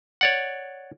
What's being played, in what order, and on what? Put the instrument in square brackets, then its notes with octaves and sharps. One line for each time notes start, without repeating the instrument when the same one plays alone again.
[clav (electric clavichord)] C#5 D5 F#5